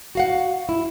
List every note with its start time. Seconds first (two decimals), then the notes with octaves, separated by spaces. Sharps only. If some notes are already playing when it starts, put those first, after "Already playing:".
0.15 F#4 F5 F#5
0.69 E4